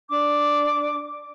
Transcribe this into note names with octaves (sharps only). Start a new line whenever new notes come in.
D4 D6